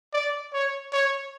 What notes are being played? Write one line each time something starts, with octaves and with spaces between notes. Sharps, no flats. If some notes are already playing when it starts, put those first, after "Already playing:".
D5
C#5
C#5